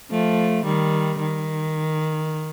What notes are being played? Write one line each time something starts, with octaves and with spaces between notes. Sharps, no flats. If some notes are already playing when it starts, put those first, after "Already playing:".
F3 A3
D#3 G3
D#3